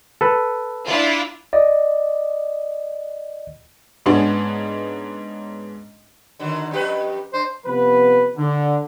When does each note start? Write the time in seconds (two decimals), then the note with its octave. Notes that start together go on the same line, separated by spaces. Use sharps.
0.21 A4 B4
0.86 D4 E4 F4
1.53 D5 D#5
4.06 G#2 B3 C#4 D4
6.39 D3 D#3 F#3
6.71 F2 G4 B4
7.33 D4 C5
7.66 C3 F3 B3 B4
8.37 D3